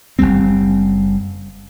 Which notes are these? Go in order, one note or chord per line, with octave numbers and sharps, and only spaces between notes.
F#1 E2 G3 C4